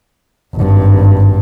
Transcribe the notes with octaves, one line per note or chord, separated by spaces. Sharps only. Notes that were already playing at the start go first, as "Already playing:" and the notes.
G#1 G2